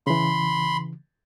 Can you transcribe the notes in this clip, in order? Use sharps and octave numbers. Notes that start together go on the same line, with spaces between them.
C#3 E3 B5 C6